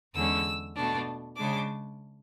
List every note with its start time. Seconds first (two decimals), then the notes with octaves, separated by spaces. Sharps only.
0.15 E2 D3 G#3 C#4 E6
0.75 B2 A3 D4
1.36 C#3 G#3 D4 D6